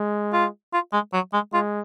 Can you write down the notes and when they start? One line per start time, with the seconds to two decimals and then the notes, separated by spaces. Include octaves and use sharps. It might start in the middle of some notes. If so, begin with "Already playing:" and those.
Already playing: G#3
0.33 F4
0.73 F4
0.93 G#3
1.13 F#3
1.33 G#3
1.53 G#3 F4